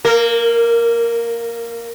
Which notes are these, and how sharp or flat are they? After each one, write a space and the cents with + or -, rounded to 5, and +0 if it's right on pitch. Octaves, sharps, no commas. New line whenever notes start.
A#3 +0 A#4 -25